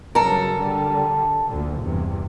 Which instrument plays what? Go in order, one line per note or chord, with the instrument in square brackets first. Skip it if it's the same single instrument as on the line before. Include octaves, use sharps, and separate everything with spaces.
[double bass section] G2 C#3 F#3 [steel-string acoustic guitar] A4 A#4
[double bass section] D3 G3
D2 A#2 D3
E2 G2 C3